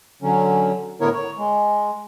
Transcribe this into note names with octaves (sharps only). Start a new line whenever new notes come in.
D3 F#3 C#4
A2 D3 B3 E4 A#4 C#5
C#5
G#3